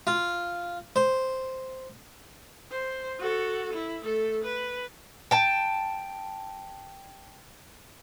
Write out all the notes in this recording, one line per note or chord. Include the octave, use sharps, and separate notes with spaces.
F4
C5
C5
F#4 A4
E4
A3 A4
B4
G5 A5